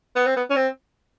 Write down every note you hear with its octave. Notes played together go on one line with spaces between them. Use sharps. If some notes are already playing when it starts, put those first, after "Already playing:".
B3
C4
B3
C#4
C4